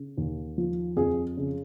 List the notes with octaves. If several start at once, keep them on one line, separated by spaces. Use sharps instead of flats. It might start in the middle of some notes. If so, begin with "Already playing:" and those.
Already playing: C#3
D#2
F3
F2 G#4
C#3